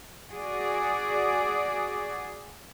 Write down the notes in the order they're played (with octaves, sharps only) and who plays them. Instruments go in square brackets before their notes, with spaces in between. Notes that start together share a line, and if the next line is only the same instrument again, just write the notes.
[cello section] F#4 G#4 D5